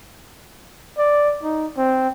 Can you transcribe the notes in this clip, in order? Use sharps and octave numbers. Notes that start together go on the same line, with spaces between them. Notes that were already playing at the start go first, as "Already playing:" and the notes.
D5
D#4
C4